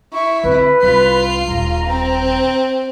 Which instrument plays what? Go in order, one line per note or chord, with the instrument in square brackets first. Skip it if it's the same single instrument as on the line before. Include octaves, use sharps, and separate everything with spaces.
[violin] E4 [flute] C#6
[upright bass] D3 C4 [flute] B4
[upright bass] C2 [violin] F4 C7
[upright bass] D#1 [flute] A#5
[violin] C4